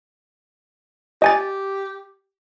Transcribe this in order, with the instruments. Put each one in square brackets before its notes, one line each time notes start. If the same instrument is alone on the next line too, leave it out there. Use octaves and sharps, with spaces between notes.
[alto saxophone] G4 [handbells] D#5 G#5 A6